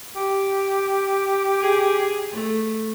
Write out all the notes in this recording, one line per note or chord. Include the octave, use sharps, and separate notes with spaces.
G4
G#4
A3